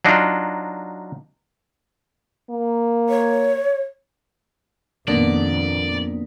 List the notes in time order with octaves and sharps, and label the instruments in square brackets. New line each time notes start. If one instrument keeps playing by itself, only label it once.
[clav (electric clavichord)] F#3 D4 D#4 F4
[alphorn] A#3
[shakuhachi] C#5
[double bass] F2 A#2 [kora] D3 [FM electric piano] D#3 A#3 B3 [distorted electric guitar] D5